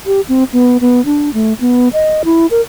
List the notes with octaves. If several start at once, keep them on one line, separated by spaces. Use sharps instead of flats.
G4
C4
B3
B3
D4
A3
B3
D#5
E4
A#4